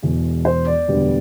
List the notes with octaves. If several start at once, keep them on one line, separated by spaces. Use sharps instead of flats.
E1 E2 B2
C5
D5
E1 D2 D3 G3 B3